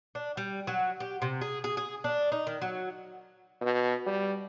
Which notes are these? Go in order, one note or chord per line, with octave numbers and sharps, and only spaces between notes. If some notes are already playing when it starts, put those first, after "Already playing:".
D4
G3
F#3
G4
C3
G#4
G#4
G#4
D4
D#4
D#3
F#3
B2
G3